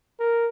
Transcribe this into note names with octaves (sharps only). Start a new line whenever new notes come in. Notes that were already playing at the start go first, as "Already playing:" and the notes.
A#4